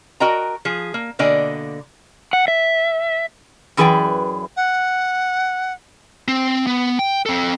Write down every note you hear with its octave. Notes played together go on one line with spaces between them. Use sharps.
F#4 A#4 D#5 G5 A#5
F3 G#4
A#3
B2 D3 A#3 D5 D#5 G#5
F#5
E5
F#2 E3 G#4 B4 D5 G5
F#5
C4
B3
G5
C4 A4